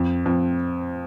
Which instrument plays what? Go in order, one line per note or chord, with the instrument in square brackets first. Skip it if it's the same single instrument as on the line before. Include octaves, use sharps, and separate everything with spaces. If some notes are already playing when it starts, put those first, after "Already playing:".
Already playing: [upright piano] F2
F2